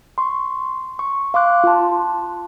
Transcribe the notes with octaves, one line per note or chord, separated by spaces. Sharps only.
C6 C#6
C#6
F5 C6 D6 F#6
F4 A5